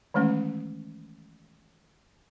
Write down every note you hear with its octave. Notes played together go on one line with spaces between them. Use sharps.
D#3 E3 G#3 A3 C#4